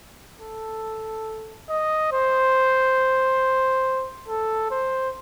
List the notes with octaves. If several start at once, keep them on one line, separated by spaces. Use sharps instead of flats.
A4
D#5
C5
A4
C5